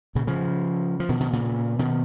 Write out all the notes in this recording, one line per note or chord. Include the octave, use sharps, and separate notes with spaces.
A#2 C#3
C#3 F3
F3
B2 D#3
B2 D#3
A#2 C#3
B2 D#3